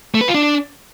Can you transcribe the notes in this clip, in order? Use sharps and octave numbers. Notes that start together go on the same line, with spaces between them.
A3
B4
F4
D4